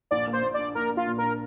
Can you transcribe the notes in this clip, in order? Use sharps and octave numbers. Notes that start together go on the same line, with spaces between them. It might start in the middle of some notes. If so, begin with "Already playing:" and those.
A#1 D5
A#3
C5
A#2
D4 D5
A#1 A#4
A#3
F4
A#2
D4 A#4